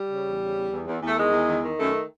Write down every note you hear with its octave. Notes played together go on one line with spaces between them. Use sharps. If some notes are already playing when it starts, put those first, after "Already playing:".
Already playing: G3
C#3
E2
C#3
E2
E2
E2
E2 A3
D#3 G#3
E2
D#3
D#3
F#2 A3